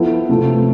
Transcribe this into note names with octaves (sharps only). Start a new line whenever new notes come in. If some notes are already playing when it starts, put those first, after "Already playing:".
Already playing: F3 B3 E4 A4
C3 F3 A3